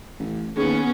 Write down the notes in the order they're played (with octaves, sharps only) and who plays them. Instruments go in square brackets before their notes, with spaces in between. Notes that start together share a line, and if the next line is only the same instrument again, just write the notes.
[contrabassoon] A1
[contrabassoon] D#2 [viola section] B3 G#4 [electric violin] C#4